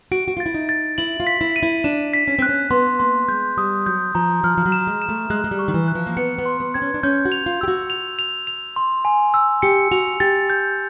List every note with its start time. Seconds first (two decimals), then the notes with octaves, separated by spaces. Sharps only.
0.12 F#4 D7
0.28 F#4
0.37 F4 A6
0.46 E4
0.54 D#4
0.69 A6
0.98 E4 F#7
1.20 F4
1.27 B6
1.41 E4
1.56 D#7
1.63 E4
1.84 D4 E7
2.13 B6
2.28 C#4
2.39 C4 F#6
2.49 C#4
2.71 B3 C6
2.99 A#3 C6
3.28 G#3 G6
3.57 G3 D#6
3.86 F#3 G6
4.15 F3 A#5
4.44 F3 F6
4.57 F3
4.66 F#3
4.72 E7
4.87 G#3
5.02 E7
5.09 A3
5.30 G#3 F#6
5.44 G#3
5.51 G3
5.59 C#6
5.68 D#3
5.74 E3
5.88 F#6
5.95 F3
6.07 A#3
6.17 B3 C#7
6.38 B3
6.46 C6
6.60 B3
6.74 C4 G#6
6.82 C#4
6.94 D4
7.03 C#4 G6
7.25 F#4
7.32 F7
7.46 F4
7.61 G4 E6
7.68 F#4
7.90 F7
8.19 F7
8.47 F7
8.76 C6
9.05 G#5
9.34 E6
9.62 G4 C#7
9.91 F#4 F7
10.20 G4 A6
10.50 G6